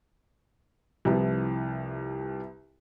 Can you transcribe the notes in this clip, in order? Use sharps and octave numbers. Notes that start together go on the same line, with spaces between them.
C2 C3 F3 E4 B4